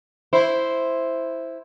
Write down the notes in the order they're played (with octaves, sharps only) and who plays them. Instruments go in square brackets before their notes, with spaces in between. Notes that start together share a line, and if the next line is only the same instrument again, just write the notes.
[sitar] E4 C5